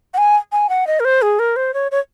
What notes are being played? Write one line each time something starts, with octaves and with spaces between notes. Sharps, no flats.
F#5
G#5
G#5
F#5
D#5
A#4
C5
G#4
A#4
C5
C#5
C#5